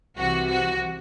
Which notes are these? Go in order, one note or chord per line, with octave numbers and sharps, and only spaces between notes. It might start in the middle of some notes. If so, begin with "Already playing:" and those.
C2 C3 E3 F#4
F#4